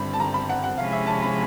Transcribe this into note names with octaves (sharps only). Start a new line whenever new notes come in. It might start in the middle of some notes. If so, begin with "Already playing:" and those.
Already playing: G2 D3 G3 C4 B5
A5
A#5
B5
F#5
F#5
C3 F3 G#3 C#4 E4 F5
E5
A5
B5